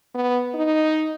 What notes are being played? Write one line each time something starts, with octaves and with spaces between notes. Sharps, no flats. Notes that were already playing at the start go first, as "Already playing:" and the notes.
B3
D#4